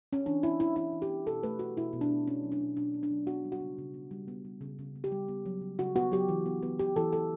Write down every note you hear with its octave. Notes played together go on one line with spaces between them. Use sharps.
C#4
E3 D4
B3 E4
B3 E4
E3 E4
E3
G4
B3
B2 A4
A3 B4
A3 F#4
B2 E4
B2
D4
A3
B3 C#4
F#3
D4
B2
B2 D4
B3
D4
F#3
B3 F#4
G3
F#4
C#3
C#3
B3
G3
B3
G3
C#3
C#3
B3
G4
G3
B3
F#3
C#3
C#3 F#4
B3 F#4
F#3 G4
E3
B3
B3
E3 G4
E3 A4
B3 A4